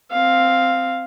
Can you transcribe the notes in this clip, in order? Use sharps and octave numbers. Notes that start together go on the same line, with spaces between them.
C4 F5